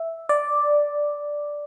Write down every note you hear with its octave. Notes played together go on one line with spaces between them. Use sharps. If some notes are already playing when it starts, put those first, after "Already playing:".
Already playing: E5
D5